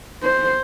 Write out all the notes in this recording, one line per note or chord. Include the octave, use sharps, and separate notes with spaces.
C5